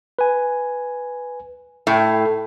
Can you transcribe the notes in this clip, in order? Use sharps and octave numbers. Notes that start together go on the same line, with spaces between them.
B4 G#5
A2 E5 G5